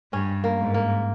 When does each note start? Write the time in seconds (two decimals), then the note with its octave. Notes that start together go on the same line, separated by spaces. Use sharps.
0.12 G2 C#4
0.44 A#3
0.59 G#2
0.74 A#3